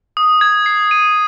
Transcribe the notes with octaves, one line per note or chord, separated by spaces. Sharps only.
D#6
G#6
C7
D#7